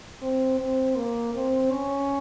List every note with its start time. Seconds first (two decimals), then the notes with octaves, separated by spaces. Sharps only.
0.22 C4
0.59 C4
0.96 A#3
1.34 C4
1.71 C#4